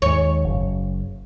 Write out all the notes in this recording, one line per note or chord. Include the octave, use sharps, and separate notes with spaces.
D#2 G#2 C#5
F#1